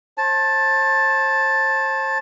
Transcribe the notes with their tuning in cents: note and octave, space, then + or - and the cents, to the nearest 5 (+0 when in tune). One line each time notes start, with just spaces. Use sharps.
C5 +40 A5 +0